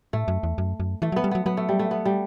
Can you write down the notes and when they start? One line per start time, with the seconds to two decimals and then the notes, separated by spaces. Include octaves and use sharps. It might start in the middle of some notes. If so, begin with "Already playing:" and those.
0.13 A2 A3
0.28 F#2
0.43 E2
0.58 F#2
0.80 F#2
1.02 E3 A3
1.12 F#3
1.16 B3
1.24 G3
1.31 F#3 B3
1.46 F#3 B3
1.57 A3
1.69 G3
1.79 A3
1.91 B3
2.05 G3